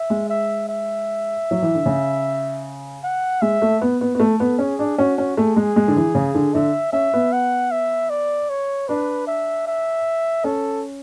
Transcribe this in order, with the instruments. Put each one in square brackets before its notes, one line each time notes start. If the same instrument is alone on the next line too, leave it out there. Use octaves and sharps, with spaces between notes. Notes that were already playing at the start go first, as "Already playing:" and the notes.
Already playing: [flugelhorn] E5
[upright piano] G#3
[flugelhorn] E5
E5
[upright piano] F#3
E3
D3
C#3
[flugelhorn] F#5
[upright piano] G#3 [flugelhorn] E5
[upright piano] A3
B3
B3
B3
[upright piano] A3 [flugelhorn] A4
[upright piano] B3
[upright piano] C#4 [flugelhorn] G#4
[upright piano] D4
[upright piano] C#4 [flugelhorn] F#4
[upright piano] C#4
[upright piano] A3 [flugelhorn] G#4
[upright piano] G#3
G#3
D3
E3
C#3
D3
[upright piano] D3 [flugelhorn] E5
[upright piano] C#4 [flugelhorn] E5
[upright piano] B3
[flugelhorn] F#5
E5
D5
C#5
[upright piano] D4 [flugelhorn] B4
[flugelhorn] E5
E5
[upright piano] C#4 [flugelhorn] A4